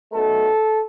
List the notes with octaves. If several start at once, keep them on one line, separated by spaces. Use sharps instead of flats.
B1 B2 A3 A4